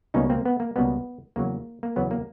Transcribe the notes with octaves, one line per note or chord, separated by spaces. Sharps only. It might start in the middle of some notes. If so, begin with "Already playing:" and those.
C#2 B2 G3 A#3 C#4 D#4
A#3 C4
B3
A#3
C#2 B2 G3 A#3 B3
E2 C#3 F#3 A#3
A#3
E2 C#3 F#3 B3
A#3